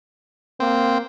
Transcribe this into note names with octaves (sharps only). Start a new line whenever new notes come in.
A#3 C4